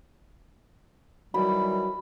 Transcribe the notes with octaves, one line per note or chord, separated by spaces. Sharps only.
D#3 E3 F#3 G3 B5